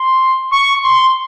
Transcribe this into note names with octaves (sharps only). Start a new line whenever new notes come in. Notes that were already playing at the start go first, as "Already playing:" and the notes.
Already playing: C6
C#6
C6